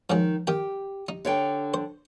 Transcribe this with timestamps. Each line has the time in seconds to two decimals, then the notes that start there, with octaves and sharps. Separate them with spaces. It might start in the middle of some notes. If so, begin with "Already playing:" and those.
0.10 D#3 F3 F#3 G#3
0.47 D#3 G4 G5
1.09 D#4
1.25 D3 C#5 G5
1.74 C5